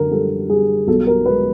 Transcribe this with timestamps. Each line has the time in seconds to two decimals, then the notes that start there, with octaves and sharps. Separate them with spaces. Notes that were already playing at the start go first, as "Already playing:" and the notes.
Already playing: F#2 D3 A4 A#4
0.11 G3 A4
0.50 G3 G#4
0.88 B1 A4
1.07 A#4
1.25 G#3 B4